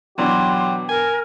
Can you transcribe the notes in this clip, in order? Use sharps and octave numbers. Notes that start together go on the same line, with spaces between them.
B2 E3 F#3 D4 G4 C6
A#4 G#5